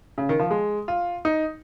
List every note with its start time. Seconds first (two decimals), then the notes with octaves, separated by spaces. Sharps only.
0.18 C#3
0.29 D#3
0.39 F3
0.51 G#3
0.88 F4
1.25 D#4